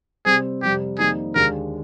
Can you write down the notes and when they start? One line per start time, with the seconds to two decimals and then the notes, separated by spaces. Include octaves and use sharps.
0.25 C3 G3 C4 G#4
0.62 F2 C3 G3 G4
0.99 F2 D#3 G3 A#3 D#4 G#4
1.35 D#2 D3 G#3 D4 A#4